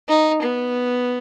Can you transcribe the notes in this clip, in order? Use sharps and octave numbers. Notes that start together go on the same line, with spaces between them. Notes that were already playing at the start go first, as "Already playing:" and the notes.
D#4
B3